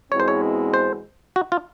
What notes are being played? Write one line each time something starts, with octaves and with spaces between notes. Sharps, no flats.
E2 B2 G#3 C4 E4 C#5
C5
C#5
C5
F#4
F4